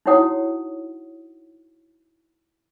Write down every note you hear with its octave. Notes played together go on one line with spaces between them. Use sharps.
D#4 E4 F#4 C#5 F#5 D#6